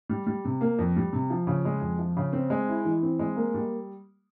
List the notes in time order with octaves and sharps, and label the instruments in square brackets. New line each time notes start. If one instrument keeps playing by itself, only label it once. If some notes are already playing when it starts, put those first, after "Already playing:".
[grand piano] G3
G3
C3
A#3
F2
G3
C3
F3
C#3
G#3
F2
F3
C#3
C4
G#3
E4
E3
C4
G#3
A#3
G3